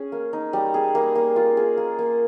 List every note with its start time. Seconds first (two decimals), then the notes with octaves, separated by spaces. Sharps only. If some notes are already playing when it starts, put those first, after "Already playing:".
Already playing: C#4 G#4
0.12 A#3
0.33 D#4
0.53 G3
0.74 G#4
0.95 A#3
1.15 A#3
1.36 F4
1.57 G#4
1.78 A#3
1.99 A#3